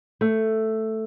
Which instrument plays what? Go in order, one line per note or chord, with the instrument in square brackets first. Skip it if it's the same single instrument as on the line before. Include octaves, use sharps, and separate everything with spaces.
[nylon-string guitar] A3